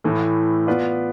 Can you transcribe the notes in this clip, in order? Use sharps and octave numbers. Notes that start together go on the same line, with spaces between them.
A2 E3 A3
B3 F4 B4 D5